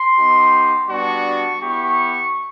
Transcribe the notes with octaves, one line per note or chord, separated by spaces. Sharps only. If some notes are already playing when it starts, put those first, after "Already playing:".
Already playing: C6
B3 D#4 G4
G3 B3 D4 F#4 C#6
B3 E4 G4 C#6